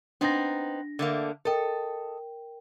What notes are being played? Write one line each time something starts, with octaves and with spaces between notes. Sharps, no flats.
B3 C4 D4 D#4 A#6
D3 A3 A#3
A4 A#4 D#5 G5